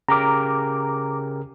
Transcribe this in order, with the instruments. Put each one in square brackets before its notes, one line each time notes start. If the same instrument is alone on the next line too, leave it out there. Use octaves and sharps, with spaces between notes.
[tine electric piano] C#3 G4 A#4 [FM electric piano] A#5 D6